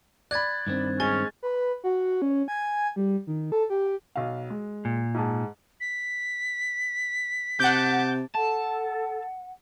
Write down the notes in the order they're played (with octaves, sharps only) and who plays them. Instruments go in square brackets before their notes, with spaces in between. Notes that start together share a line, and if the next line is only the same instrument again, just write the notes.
[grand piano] D5 B5 [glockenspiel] F#6 G#6 A6
[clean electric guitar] G2 D#3 C4
[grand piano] G#3 G#5 G7 [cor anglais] C#4 [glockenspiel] A6
[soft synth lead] B4
F#4
C#4
G#5
G3
D#3
A4
G4
[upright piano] B1 F5
G#3
[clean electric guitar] A#2
[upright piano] G#2 G#4 A5
[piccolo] B6
[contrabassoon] C3 [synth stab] F#5 G6 [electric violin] A5 D6
[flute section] A4 [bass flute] F#5 [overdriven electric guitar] A5